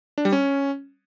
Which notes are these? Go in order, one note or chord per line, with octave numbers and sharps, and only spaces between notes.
D4
G3
C#4